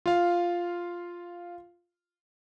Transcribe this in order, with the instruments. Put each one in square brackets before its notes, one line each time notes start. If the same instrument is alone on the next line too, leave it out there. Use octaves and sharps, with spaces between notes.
[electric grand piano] F4 F5